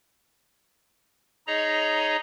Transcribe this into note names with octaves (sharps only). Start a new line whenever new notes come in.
D#4 G#4 C#5 D#5 A#5